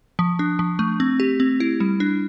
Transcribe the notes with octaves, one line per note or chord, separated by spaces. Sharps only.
F3
D4
F3
A3
C4
G4
C4
E4
G3
D4